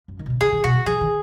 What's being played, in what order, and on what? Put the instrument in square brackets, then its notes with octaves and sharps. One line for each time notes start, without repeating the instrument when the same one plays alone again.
[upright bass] F#2
D#3
B2
C#3
[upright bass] C#3 [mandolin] G#4
[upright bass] D#3
[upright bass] B2 [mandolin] F#4
[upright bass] D#3
[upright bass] F3 [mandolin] G#4
[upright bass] D#3